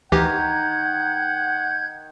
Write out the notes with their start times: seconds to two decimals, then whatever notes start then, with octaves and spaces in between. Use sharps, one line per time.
0.12 D2 D#3 E3 G4 F#5 A#5 G6 G#6